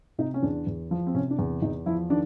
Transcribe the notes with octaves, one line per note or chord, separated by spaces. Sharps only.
C3 D#4
C#4
E2 D4
E2
F3
C4
C3 C#4
D4
E2
E2 D#4
F3 E4
D#3 D4